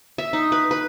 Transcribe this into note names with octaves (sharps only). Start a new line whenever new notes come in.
E5
D#4
B4
B4